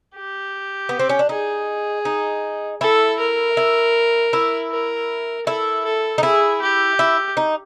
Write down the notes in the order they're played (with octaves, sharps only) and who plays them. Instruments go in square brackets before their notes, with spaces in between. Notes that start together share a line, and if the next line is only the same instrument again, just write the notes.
[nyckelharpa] G4
[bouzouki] B3
C4
C#4
D4
[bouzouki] D#4 [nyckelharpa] G#4
[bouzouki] D#4
[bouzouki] E4 [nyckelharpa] A4
[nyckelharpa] A#4
[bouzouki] E4
E4
[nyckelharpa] A#4
[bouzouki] E4 [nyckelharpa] A4
[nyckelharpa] A4
[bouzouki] D#4
[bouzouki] E4 [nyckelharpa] G#4
[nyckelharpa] G4
[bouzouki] E4
D#4